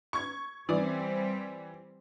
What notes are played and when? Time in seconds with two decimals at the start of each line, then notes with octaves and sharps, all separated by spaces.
0.13 C#6 G#6
0.69 E3 G3 C4 D5